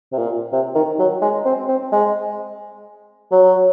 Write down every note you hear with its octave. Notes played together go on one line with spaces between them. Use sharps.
C3
A#2
C3
D#3
F#3
G#3
C4
C4
G#3
F#3